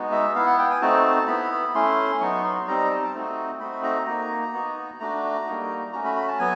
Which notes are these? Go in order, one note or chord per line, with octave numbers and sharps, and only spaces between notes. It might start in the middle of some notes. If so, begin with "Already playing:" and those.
Already playing: G#3 B3 D#4 F#4
E5
B3 E4 F5
F#5
G5
G#5
A3 C4 D#4 F#4 A5
B3 E4 B5
B5
A3 C#4 E4 C6
F#3 B3 D#4 F#4 C#6
C6
G3 C4 D#4 A#5
A5
A3 C4 D#4 F#4
A3 C4 D#4 F#4 B5
A#5
A#3 D#4 F#4 A#5
B3 D#4 F#4
A3 D4 F#4 A#5
G3 A#3 D#4 F#4
A3 C#4 F#4 A#5
B5
B5
A5
F#3 B3 G#5